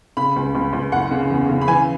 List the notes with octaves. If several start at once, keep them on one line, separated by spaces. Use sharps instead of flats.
C#3 B5
C#2
C#2
C#2
F#1 F#5
C#3
E2
C#3
B5
E3 G#5